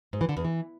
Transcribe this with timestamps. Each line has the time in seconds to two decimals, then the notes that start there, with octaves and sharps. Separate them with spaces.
0.13 G#2
0.21 E3
0.29 D3
0.37 E2
0.44 E3